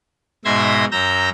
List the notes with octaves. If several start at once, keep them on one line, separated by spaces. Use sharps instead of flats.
G#2 B2 E5 C6 G#6 A#6
F#2 A#5 E6 G6 A#6